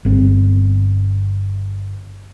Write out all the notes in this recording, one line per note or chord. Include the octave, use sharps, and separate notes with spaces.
G1 C4